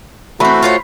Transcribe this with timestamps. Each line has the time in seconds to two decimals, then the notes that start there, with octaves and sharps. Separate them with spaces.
0.40 E3 A3 C4 F#4 B5
0.62 F4 C5 C#5